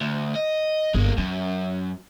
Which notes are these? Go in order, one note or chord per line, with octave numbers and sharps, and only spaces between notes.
D2
D#5
G1 G#3 A#3
F#2 C#4